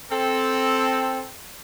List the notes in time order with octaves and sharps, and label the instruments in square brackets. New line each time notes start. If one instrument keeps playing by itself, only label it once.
[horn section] C4 A4